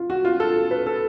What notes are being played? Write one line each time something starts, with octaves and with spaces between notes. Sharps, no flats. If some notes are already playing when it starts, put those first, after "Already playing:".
Already playing: F4
F#4
F4
A4
B4
A4